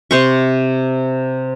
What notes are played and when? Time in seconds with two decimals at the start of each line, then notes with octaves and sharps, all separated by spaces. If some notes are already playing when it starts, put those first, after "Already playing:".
0.11 C3 C5 C#6